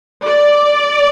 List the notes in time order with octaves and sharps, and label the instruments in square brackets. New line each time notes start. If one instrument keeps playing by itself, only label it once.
[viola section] D5